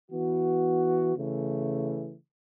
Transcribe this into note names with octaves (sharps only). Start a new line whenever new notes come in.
E3 B3 F#4
C#3 E3 A3